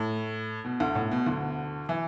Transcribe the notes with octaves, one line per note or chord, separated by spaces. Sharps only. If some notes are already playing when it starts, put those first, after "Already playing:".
Already playing: A2
B2
D2 D3
A2
B2
D2 D3
E3